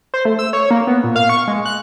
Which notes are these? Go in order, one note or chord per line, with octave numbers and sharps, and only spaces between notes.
C5
A3
E6
C#5
A#3
B3
A#2
F5
C#6
G#3
F#6